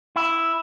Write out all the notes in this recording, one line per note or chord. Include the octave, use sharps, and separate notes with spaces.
E4